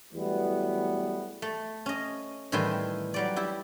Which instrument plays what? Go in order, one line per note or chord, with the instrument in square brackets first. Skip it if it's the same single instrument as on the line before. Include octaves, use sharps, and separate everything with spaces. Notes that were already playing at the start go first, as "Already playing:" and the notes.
[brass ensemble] E2 F#3 G3 A3 B3
[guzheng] A3
C#4 D#5
A2 D#3 E3 G3 G#5 C6
F#3 G3 D5
E4 G4